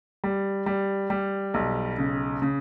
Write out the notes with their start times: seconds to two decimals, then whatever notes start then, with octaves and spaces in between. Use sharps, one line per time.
0.24 G3
0.66 G3
1.10 G3
1.54 B1
1.98 C#3
2.42 C#3